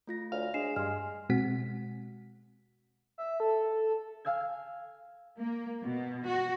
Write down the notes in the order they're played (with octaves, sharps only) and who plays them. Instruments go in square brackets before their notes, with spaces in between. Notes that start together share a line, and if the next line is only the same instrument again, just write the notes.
[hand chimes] A3 F4 A#6
[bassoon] D2 [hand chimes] C#5 [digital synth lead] F5
[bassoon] G#3 [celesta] D4 C7 E7
[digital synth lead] G2 [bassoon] G#3 [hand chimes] G#5 [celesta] C6 F6
[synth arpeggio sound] B2 G#3 C4 F#4 F#5 B6
[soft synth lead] E5
A4
[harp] F5 G#5 E6 G#6
[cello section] A#3
B2
F#4